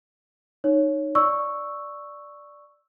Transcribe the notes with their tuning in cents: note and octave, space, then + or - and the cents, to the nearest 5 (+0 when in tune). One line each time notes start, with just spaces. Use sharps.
D#4 -15 C#5 +0
D5 +0 C#6 +0 E6 +0